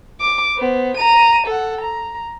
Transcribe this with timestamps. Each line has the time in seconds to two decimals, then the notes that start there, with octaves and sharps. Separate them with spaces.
0.20 D6
0.57 B3 C5
0.97 A#5 D#7
1.46 A4 F#5
1.81 A#5